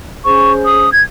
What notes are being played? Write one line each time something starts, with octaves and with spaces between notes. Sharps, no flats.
C#4 G#4 C5 C#6
D#6
G#6